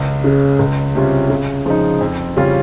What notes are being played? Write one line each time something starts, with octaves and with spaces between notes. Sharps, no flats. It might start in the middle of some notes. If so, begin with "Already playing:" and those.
Already playing: C#2
C#3 G#3 C#4
C#2
C3 G3 C#4 F4
C#3
F3 G#3 D#4
F2
C#3 G3 C#4 F4